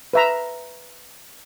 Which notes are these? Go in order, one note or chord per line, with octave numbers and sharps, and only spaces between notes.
B4 E5 A#5